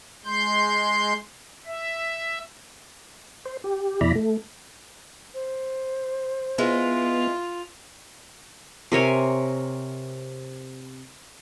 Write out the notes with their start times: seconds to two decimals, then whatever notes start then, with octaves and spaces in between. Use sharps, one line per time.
0.25 G#3 C6 G6
1.66 E5
3.45 C5
3.64 G4
4.01 F2 B2 E4 D5 A#5 B5
4.15 A3
5.34 C5
6.58 G#3 B3 E4 F4
8.92 C3 A#4 C#5 G#5